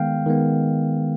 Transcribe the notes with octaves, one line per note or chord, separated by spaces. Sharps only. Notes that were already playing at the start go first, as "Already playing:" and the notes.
Already playing: D#3 G#3 B3 F5 G5
D#3 G#3 B3